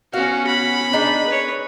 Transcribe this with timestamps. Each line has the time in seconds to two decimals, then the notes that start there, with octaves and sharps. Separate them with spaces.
0.13 B3 C#4 F#4 F5
0.47 B5
0.93 D4 D#4 G#4
1.27 B4 C#5